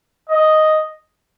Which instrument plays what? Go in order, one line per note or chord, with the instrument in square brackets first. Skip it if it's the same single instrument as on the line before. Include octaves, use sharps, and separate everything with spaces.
[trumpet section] D#5